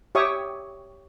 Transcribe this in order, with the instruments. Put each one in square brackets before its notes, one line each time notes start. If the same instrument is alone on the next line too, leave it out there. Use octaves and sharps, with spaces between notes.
[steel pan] G4 C#5 E5 C#6 D#6